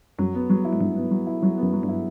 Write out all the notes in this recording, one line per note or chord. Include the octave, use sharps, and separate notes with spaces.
F#2 F#3
B3
F#3
E4
G#2
G2 F#3
B3
F#3
E4
F#2 F#3
B3
F#2
F#3
G2
E4